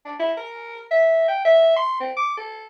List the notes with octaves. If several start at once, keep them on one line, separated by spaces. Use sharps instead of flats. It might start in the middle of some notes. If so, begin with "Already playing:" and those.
D4
E4
A#4
E5
G5
E5
C6
C4
D6
A4